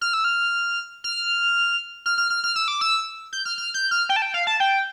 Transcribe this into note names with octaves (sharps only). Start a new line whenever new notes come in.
F6
E6
F6
F6
F6
F6
F6
F6
E6
D6
E6
G6
F6
F6
G6
F6
G5
A5
G5
F5
A5
G5